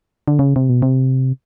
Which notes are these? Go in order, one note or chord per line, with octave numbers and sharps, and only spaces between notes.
D3
C#3
C3
B2
C3